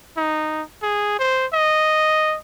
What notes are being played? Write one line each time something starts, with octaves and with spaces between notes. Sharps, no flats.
D#4
G#4
C5
D#5